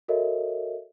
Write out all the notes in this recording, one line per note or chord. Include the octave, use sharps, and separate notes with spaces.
F#4 A4 A#4 C#5 D#5 E5